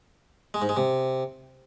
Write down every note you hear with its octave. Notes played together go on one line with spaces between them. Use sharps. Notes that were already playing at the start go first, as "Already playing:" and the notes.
G#3
G#2
G#3
C3